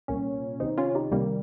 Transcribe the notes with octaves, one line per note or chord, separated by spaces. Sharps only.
C2 A#2 A#3 C#4
C2 C3 D#3 C4 D#4
C#4 F4
D#4 G4
C2 C3 D#3 G3 A#3